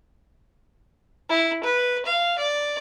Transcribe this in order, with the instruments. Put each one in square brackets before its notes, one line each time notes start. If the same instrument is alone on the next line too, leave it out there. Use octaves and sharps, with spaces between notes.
[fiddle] E4
B4
F5
D5